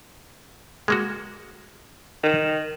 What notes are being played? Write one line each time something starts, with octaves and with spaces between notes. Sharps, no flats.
G#3 A#3 F#4
D#3